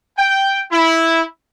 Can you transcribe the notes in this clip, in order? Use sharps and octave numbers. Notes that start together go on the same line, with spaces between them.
G5
E4